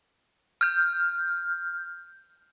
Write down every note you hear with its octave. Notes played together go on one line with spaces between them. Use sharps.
F6 G6